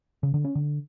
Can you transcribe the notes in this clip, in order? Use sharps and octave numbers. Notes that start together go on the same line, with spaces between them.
C#3
D3
C#4
D3